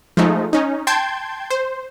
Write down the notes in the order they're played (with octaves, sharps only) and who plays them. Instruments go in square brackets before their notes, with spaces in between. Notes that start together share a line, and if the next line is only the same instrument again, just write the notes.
[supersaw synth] F3 G#3 A3 D#4
C#4 D#4
G5 A5 C6 G6 G#6
C5